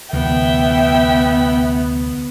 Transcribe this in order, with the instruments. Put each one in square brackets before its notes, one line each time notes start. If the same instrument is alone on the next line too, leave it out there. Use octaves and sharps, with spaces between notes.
[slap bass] D2 C3 E3 [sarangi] B3 [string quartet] E5 G5